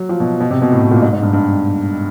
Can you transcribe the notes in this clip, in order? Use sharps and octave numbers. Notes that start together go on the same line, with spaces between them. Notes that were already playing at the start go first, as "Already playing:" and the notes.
Already playing: F#3
F3
B2
B2
C3
B2
A2
B2
A#2
G#2
G#2
G2
G2